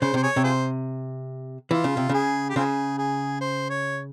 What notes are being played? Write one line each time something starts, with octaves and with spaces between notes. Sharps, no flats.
C#3 C5
C3 C5
G#4 C#5
C3
F4 G#4 C5
E3 F4
C#3
C3
C#3 G#4
G4
C#3 C4 F4 G#4
G#4
C5
C#5